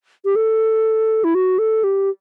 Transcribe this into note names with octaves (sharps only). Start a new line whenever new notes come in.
G4
A4
E4
F#4
A4
G4